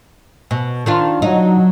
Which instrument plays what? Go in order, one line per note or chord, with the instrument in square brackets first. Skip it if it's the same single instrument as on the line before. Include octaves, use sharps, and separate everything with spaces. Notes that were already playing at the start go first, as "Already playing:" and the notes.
[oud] B2
D#3 D4 F4
[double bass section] F#3 [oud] D#4